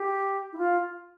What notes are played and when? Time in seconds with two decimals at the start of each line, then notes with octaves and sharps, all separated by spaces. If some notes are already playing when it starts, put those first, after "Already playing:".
Already playing: G4
0.53 E4
0.58 F4